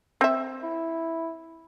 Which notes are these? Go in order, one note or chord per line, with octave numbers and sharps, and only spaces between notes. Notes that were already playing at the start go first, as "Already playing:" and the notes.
C4 E5
E4